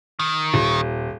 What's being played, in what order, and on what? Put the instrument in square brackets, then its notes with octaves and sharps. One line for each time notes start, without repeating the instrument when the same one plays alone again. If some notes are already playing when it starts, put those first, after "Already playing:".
[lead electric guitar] D#3
[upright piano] D#1